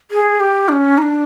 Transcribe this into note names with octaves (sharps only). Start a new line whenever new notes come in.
G#4
G4
D4
C#4
D#4
D4